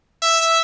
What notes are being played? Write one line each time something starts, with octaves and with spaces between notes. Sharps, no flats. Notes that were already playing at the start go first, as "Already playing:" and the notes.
E5